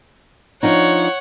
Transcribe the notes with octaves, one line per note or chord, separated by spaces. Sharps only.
F3 D4 D#4 C#5 F#5